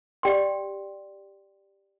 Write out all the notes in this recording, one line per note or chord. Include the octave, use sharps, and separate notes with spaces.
G4 D5 G5 C6